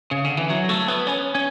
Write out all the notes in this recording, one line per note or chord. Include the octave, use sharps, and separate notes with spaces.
C#3
D3
E3
F#3
A3
B3
C#4
C#4